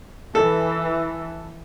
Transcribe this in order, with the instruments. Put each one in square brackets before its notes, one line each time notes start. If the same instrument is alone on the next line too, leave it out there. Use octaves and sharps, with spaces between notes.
[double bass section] E3 [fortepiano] A4